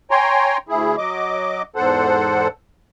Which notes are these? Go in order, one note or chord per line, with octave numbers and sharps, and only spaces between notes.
C#5 G5 G#5 A#5 C6
D2 E4 G#4
F#3 D#5 D6
E2 G#2 A4 C5 F#5